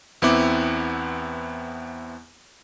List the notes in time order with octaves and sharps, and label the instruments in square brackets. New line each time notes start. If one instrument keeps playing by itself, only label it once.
[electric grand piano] E2 B3 C4 E4 D6